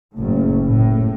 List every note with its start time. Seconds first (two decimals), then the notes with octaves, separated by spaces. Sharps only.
0.13 F#1 A2
0.65 A2